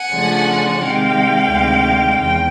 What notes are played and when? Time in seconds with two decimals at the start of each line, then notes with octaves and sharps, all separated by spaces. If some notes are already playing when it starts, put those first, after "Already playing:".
Already playing: F#5 G#5
0.10 C#3 F3 A3 D4 F4
0.80 C3 D#3 G#3 F5 G5
1.50 D2 C3 D#3 G#3
2.20 E2 G5